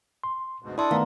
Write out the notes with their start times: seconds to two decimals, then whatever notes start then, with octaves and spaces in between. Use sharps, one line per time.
0.24 C6
0.63 D2 G#2 B2
0.78 D4 E4 A4 D5 C6 D#6
0.91 D#3 A3 B3 F5 A#5